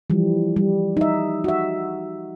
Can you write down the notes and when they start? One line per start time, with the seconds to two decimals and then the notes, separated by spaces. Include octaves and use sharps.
0.10 E3 F3 G3
0.56 G3
0.97 D#4 E5
1.44 F#4 E5